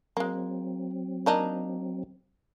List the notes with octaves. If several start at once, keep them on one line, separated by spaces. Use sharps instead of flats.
F#3 G#3 A#3 C4
A#3 D4 D#4